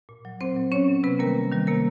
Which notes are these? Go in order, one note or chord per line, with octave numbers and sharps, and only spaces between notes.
A#2
F#3
A#2 C4 C5
F#3
A#2 C#4 C#5
F#3
C3 B3 B4
D#3 G3 A#3 A#4
C3
D#3 G3
C3 A#3 A#4